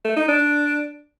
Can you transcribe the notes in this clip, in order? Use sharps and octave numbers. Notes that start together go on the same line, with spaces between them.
A3
D#4
D4